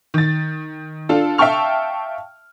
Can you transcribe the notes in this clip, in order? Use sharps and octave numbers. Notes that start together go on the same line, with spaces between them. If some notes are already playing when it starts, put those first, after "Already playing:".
D#3 A6
D4 F4 A4
E5 F5 G5 A5 C#6 F6